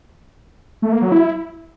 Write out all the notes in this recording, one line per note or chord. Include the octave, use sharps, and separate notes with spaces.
A3
A#3
F#3
E4